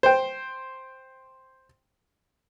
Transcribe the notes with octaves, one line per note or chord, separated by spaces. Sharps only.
C5 G5